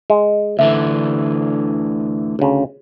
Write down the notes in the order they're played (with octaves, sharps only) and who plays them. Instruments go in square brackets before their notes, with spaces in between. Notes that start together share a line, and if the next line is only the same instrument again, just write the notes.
[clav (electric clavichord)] G#3
[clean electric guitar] D2 D3 E3 [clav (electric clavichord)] E5
[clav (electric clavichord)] D2 C#3